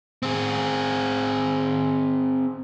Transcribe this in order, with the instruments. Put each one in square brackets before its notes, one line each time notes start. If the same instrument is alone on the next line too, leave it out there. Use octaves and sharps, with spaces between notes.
[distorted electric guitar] C4 G#4